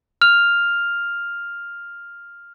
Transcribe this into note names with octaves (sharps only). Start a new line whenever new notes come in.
F6 F7